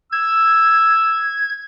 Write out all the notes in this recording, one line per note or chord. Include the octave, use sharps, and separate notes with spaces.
E6 G#6